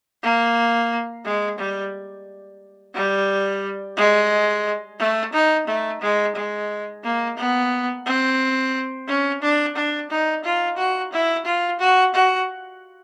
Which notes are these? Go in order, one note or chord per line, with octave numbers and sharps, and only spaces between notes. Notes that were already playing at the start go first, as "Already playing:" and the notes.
A#3
G#3
G3
G3
G#3
A3
D#4
A3
G#3
G#3
A#3
B3
C4
C#4
D4
D4
D#4
F4
F#4
E4
F4
F#4
F#4